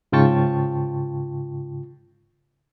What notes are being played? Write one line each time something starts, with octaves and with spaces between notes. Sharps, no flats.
G#2 C#3 F4 G5 A5 C#6